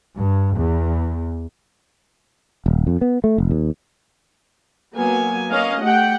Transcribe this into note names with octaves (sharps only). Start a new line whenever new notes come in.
G2
E2
D#1
F2
B3
A3
F1
D#2
F#3 A#3 B3 G#5
A#3 C#4 D#5 F5
A3 G4 F#5 G5